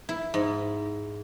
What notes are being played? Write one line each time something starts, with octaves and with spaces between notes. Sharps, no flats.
E4
G#2